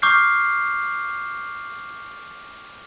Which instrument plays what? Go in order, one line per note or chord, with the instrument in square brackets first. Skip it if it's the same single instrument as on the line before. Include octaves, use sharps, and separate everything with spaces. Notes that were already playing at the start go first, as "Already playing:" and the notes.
[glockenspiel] C#6 D6 F6 G6 C7